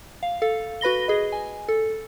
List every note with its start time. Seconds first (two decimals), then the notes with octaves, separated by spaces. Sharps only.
0.23 F5
0.42 A4 F5
0.81 F#4 B4 B5 A#6 G7
1.08 G#4 D#5
1.32 G#5
1.68 A4